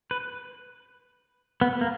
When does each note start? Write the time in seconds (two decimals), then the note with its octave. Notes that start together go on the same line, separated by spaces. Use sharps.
0.11 B4
1.61 B3
1.81 A#3